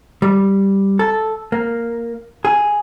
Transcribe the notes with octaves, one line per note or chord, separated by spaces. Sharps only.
G3
A4
A#3
G#4